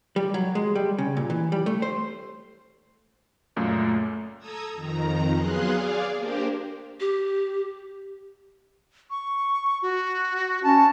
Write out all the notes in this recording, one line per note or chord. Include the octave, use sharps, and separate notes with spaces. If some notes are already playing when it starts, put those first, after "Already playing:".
G3
F#3
G#3
G3
C#3
A#2
E3
G3
A3
C5
C#2 F#2 A#2 A3
A4 A#5 D#6 E6 G#6
F2 D#3 A#5
F#3 B3 G#4 F5 C6 F#6
G#4 D5 F5
A#3 D4 G4 A#4 C5
G4
C#6
F#4
C#4 A5